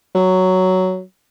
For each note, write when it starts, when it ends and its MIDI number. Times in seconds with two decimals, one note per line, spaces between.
0.15 1.02 54